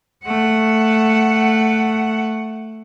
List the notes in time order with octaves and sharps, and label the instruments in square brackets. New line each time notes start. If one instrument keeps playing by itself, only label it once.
[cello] A3 F#5